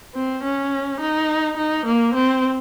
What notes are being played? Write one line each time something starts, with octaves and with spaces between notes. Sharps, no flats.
C4
C#4
D#4
D#4
A#3
C4